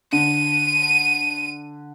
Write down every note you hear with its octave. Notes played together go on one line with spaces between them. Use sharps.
D3 D#7